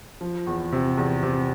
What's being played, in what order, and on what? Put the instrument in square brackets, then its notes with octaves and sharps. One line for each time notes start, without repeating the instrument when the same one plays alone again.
[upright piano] F3
E2
C3
E2
C3